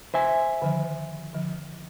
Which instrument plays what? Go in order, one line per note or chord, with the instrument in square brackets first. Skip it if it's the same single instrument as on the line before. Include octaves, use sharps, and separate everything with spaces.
[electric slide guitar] C5 E5 G#5
[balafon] D3 D#3 F3
D3 F3